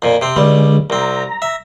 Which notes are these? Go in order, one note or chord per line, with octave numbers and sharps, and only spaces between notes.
F2 A#2
C3 C4
C#2 D3 G3 G#3
C2 C4 A#5
E5